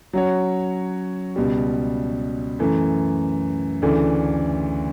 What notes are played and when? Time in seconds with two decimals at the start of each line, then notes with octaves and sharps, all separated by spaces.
0.13 F#3 C#4 F#4 C#5
1.36 C#2 B2 G3
2.59 F#2 E3 A3
3.82 D2 C#3 E3 A3 D4